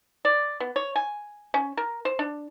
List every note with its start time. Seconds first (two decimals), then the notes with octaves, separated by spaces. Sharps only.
0.25 D5
0.60 B3
0.76 C#5
0.96 G#5
1.54 C#4
1.77 A#4
2.05 C5
2.19 D4